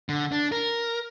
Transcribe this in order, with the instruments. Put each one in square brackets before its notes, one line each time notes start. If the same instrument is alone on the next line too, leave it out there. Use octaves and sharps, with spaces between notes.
[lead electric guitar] D3
D4
A#4